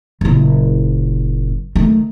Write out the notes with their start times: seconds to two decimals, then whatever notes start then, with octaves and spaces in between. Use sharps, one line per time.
0.21 F#1 A#2
1.76 D#3 A3